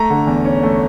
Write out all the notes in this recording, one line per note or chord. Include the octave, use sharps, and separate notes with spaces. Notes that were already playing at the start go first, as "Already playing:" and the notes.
Already playing: A3 A#5
D3
E2
C#4
A3